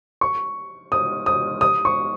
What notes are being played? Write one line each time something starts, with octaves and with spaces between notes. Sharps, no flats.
C#6
D#6
D#6
D#6
C#6